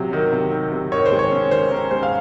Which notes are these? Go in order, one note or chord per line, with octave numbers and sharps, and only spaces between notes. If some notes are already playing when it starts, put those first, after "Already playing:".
Already playing: C3 F#3
D#3
C3
D#3
C3
D#3 C#5
C5
G#3
C#5
C#4
D#3 C5
C#4 A#4
G#3 C5
F5